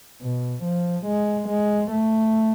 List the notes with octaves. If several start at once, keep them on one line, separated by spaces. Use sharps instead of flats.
B2
F3
G#3
G#3
A3